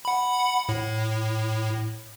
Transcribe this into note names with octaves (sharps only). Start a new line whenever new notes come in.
F#5 B5
A2